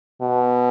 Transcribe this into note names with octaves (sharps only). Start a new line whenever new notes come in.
B2